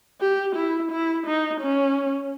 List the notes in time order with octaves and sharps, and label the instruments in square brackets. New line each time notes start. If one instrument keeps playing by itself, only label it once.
[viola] G4
E4
E4
D#4
C#4